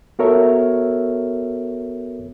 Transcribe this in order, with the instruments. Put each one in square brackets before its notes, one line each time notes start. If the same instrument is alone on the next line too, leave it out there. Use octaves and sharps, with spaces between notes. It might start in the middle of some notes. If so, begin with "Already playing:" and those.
[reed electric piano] B3 F#4 A4 A#4 C#5 E5